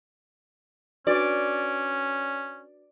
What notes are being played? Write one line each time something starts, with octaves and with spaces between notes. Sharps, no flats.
C#4 D4 F#4 B4 D5